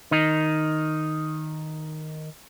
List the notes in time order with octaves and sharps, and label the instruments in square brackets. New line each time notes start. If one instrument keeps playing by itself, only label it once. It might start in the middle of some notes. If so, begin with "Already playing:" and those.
[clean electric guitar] D#3 D#4